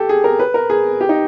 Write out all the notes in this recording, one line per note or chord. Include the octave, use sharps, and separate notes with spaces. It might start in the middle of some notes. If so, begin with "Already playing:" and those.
Already playing: G4 A4
G#4
A#4
B4
A#4
G#4
G4
D#4